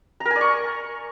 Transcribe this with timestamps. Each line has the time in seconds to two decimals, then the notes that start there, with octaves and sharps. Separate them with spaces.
0.20 A#5
0.25 A#4
0.31 G#5
0.36 D5
0.41 C#6